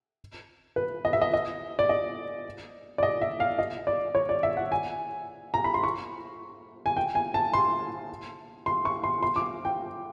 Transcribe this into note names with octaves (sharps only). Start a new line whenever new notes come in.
B4
D#5
E5
D#5
D#5
D5
D#5
D5
D#5
E5
F5
D#5
D5
C#5
D5
E5
F#5
G#5
A#5
B5
C6
C#6
G#5
G5
G#5
A5
C6
C6
C#6
C6
C6
D6
G5